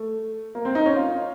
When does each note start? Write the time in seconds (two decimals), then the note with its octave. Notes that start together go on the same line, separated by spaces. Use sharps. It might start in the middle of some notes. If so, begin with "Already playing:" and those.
Already playing: A3
0.55 A#3
0.65 C4
0.75 D#4
0.86 C#4
0.97 F4